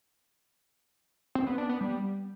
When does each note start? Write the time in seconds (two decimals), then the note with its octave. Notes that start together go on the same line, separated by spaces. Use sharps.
1.35 C4
1.47 B3
1.58 D4
1.69 B3
1.81 G3